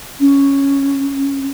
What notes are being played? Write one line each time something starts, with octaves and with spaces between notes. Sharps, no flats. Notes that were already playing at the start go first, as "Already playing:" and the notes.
C#4